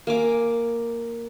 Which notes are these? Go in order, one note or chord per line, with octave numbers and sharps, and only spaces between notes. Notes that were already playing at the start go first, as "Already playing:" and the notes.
A#3 G#5 D6